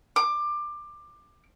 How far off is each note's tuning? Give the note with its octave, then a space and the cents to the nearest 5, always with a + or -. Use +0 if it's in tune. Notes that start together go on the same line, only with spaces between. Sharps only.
D6 +20